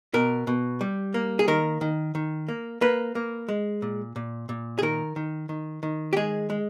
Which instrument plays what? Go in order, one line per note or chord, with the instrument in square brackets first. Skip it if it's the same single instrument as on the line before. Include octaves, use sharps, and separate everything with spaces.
[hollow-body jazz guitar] B2 A#4
B2
G3
A#3
G#4
D#3 A#4
D#3
D#3
A#3
A#3 B4
A#3
G#3
A#2
A#2
A#2
G#4
D#3 A#4
D#3
D#3
D#3
G4
G#3 G#4
G#3